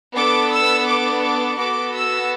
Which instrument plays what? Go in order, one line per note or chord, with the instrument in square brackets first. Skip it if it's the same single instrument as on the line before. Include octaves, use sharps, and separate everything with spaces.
[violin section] B3 D4 A4 D6
E6
D6
D6
B3 F#4 A4 D6
E6